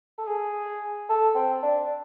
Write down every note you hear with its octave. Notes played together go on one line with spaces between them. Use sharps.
A4
G#4
A4
C4
D4